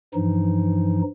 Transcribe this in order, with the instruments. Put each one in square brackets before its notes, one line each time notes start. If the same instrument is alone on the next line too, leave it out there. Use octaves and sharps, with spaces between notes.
[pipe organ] G2 E3 F3 D#4